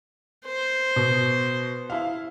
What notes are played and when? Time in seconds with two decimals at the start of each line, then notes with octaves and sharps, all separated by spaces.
0.46 C5
0.96 B2
1.90 E4 F5